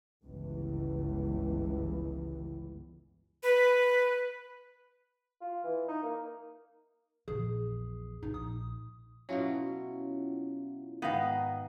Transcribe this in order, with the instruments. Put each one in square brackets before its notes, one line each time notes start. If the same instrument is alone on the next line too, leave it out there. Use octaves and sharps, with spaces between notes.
[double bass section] G1 C#2 E3
[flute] B4
[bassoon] F4
E3
D#4
A#3
[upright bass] A#1 E2 [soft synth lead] G#4
[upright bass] B2 [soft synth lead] D#4
[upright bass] A#1 [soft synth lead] D#6
[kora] B2 F#3 [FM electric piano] C#4 E4 F4
[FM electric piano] G#2 A#5 D#6 [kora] D#3 [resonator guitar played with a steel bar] B3 F5